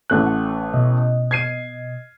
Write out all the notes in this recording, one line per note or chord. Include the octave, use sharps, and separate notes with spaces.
A1 A3 F#6
F#5
B2 D#5
G#6 C7 D#7